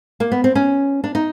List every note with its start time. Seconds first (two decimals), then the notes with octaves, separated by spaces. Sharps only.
0.20 A#3
0.32 B3
0.44 C4
0.55 C#4
1.04 D4
1.15 D#4